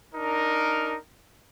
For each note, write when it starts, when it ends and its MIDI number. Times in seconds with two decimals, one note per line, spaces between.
0.14 0.97 62
0.14 0.97 63
0.14 0.97 70